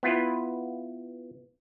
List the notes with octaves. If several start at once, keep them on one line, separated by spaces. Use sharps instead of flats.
B3 E4 F4 B4